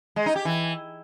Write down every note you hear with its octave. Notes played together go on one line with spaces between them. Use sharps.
G#3
D#4
G4
E3